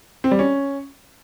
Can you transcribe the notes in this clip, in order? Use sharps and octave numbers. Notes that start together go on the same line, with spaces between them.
C4
G3
C#4